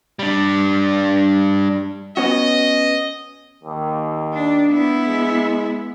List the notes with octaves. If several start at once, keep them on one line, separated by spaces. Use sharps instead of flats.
G3 D4
B3 C#4 F#4 D#5
D#2
D4
B3 E4
G#3